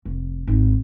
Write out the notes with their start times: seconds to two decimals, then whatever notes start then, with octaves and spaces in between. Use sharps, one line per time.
0.05 F1
0.47 G#1 D#4